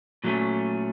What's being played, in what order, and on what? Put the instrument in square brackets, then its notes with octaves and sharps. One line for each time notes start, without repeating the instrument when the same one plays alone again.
[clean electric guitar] A#2 F#3 A3 C#4